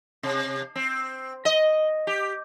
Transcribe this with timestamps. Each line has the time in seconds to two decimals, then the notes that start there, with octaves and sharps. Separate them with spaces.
0.23 C3
0.76 C4
1.45 D#5
2.07 G4